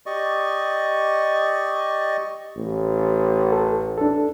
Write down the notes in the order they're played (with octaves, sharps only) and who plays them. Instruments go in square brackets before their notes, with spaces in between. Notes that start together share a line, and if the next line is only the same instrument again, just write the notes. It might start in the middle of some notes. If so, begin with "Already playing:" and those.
[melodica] G4 D5 D#5 C#6
[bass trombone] A1
[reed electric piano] A4
D4 A4